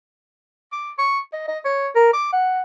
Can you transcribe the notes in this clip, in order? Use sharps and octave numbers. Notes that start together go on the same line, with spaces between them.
D6
C#6
D#5
D#5
C#5
A#4
D6
F#5